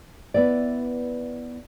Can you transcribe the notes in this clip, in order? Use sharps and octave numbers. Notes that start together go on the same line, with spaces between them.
B3 E4 D5